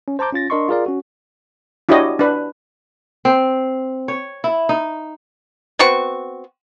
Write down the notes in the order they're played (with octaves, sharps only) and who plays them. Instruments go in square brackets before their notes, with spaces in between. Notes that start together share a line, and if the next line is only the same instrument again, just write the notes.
[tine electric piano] C#4
C5 A5 A#5 D6 G6
C#4 F4 A6 A#6
D4 A#4 D#5 C6 C#6
F4 G#4 A#4 D5 F5
C#4 F#4
[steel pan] D4 E4 F#4 G4 C#5 D#5
D4 B4
[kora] C4
C#5
E4
D#4
[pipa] B3 C4 F#4 C#6